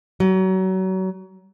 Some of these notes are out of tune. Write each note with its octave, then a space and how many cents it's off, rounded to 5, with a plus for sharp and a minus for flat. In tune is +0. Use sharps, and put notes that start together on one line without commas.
F#3 +30